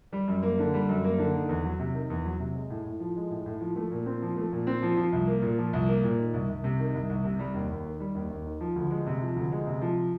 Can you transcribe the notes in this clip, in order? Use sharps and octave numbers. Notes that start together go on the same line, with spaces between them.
G3
F#2
A#3
D3
G3
F#2
A#3
D3
D#3
E2
F#3
C3
D#3
E2
F#3
C3
G#3
A2
A2
F3
G#3
A2
A2
F3
A3
A#2
C4
F3
A3
A#2
C4
F3
F3
C2
A#3
A#2
F3
C2
A#3
A#2
D#3
C2
C2
C3
D#3
C2
C2
C3
G3
D#2
D#2
D#3
G3
D#2
D#2
D#3
F3
D2
G#3
C3
F3
D2
G#3
C3
F3